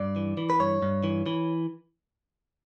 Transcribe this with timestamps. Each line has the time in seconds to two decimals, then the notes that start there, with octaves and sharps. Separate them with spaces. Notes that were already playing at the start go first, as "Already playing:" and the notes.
Already playing: G2 D5
0.16 E3
0.37 E3
0.50 B4
0.60 G2 C#5
0.82 G2
1.04 E3
1.26 E3